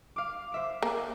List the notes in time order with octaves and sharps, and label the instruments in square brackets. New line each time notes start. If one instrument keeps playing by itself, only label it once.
[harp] F5 D6
C5 E5 D6
[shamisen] A#3